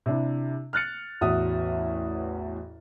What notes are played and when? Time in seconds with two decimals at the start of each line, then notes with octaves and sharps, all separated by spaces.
0.06 C3 D4 E4
0.73 F6 F#6 A6 C#7
1.21 A1 E2 A2 F#4 E5 D#6